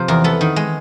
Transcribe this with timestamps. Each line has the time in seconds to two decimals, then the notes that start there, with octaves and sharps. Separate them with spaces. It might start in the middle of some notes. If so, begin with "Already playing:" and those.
Already playing: C3 F3 C5
0.08 E2 A#4
0.24 B3 A4
0.41 D#3
0.56 G#3